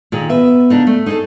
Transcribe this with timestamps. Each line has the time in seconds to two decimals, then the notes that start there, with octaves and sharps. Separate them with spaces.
0.12 A#2 D#3 G#4
0.30 B3 B4 E5
0.70 C#3 D4 D#4
0.87 A3
1.06 D#4 G#4 A4